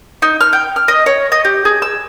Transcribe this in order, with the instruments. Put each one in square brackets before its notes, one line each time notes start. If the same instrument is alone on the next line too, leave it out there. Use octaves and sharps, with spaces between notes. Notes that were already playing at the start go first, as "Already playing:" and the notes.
[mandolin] D#4
F6
G5
F6
D#5
C#5
D#5
G4
G#4
E6